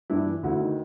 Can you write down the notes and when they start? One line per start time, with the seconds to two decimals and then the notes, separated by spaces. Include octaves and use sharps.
0.10 G2 D4 E4
0.26 E3
0.43 D2 E4 F#4
0.60 D#3